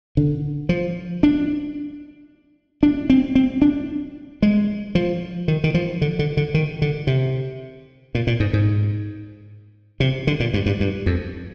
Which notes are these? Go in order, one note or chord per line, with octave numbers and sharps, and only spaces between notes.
D3
F3
D4
D4
C4
C4
D4
G#3
F3
D#3
D#3
F3
D3
D3
D3
D#3
D3
C3
A#2
A#2
G#2
G#2
C3
D3
A#2
G2
G2
G2
F2